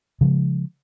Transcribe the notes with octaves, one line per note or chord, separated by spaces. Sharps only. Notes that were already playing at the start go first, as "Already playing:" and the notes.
C#3 F3 G#3